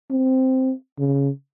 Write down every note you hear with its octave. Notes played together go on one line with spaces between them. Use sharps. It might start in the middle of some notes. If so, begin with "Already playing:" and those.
C4
C#3